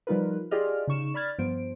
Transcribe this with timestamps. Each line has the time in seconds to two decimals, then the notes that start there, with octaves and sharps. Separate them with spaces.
0.07 F3 G3 D#4 F4 A#4 B4
0.51 F4 G4 G#4 D5 D#5 F6
0.88 C#3 D#4 C#6 E7
1.14 D5 B5 F6 G#6 A6
1.38 G2 F3 B3 C5 D7